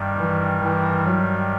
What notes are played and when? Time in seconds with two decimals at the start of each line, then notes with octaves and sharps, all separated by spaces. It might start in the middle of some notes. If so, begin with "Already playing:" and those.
Already playing: G2 D#3 G3
0.17 E3
0.62 E3
1.06 F#3